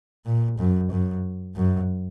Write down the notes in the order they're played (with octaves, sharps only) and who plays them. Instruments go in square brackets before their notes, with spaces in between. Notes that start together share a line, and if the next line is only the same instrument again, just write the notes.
[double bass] A#2
F#2
F#2
F#2